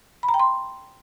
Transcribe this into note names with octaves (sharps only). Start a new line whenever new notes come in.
B5
A#5
G5
C6